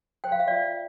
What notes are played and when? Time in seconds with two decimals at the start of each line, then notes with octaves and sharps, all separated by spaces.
0.24 C5 G5
0.32 F5
0.40 E5
0.47 F4 D5 F5